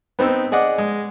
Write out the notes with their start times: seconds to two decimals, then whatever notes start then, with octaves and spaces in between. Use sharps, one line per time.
0.19 B3 C4 D#4 E6
0.52 G#4 D5 D#5 F#5 D6
0.78 G#3